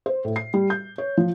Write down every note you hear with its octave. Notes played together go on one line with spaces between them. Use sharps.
C5
A2
C7
G3
G6
C#5
F3